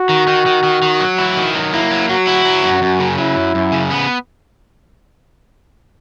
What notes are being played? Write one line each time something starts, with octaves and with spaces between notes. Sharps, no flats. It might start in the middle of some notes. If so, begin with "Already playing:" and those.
Already playing: F#4
D#3
D#3
D#3
D#3
D#3
F#3
E4
D#3
F#3
A#3 E4
F#3
F#3 F#4
E4
F#3
F#2
F#2
C#3
F#3 E4
F#2
F#2
C#3
B3